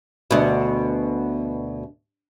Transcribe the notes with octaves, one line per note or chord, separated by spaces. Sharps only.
D2 B2